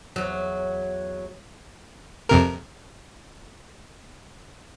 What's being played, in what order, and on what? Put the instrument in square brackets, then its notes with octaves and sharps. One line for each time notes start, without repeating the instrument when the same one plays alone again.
[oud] E2 F#3
[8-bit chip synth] F2 C3 A#4